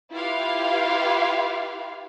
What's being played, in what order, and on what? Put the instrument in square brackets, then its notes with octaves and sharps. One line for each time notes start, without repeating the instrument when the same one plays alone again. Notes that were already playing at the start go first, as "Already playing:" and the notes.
[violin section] E4 F4 G4 B4 F5